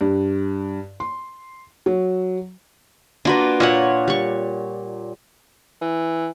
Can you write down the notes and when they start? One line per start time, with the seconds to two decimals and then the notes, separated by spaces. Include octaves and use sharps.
0.01 G2
1.00 C6
1.86 F#3
3.25 A#3 D4 F4 F#4 B4
3.60 A#2 F4 C#5 F#5
4.08 G3 C#6
5.81 E3